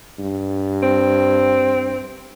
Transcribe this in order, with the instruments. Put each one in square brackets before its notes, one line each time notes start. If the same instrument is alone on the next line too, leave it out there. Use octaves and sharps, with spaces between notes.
[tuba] G2
[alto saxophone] C4